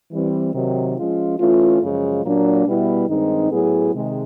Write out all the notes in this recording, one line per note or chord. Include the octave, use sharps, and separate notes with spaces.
E3 G3 C4
C3 D#3 F#3
F3 G#3 C#4 F4
E3 A3 C#4 F4
F#2 C#3 F3 G#3
A#2 F#3 A#3 D4
B2 G3 B3 E4
G2 D#3 G#3 C4 D#4
A2 F#3 B3 E4 G#4
C3 D#3 G#3